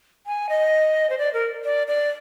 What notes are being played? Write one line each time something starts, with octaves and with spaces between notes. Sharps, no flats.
G#5
D#5
C5
D5
A#4
D5
D5